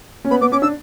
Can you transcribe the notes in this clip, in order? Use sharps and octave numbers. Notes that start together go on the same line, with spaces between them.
C#4
B3 B5
B3 D6
C#4 D6
D4 E6